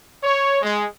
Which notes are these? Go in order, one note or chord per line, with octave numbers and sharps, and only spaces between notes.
C#5
G#3